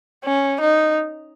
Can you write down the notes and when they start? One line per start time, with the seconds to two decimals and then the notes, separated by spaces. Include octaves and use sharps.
0.24 C#4
0.61 D#4